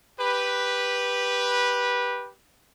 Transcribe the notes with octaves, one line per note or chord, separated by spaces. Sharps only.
G4 B4